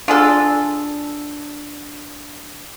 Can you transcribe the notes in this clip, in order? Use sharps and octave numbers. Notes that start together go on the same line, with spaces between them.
D4 F4 G#4 A4